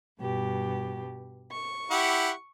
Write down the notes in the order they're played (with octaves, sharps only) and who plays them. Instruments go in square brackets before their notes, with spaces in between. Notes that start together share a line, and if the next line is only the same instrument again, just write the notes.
[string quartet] G2 B2 G4
C#6
[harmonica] E4 G4 F#5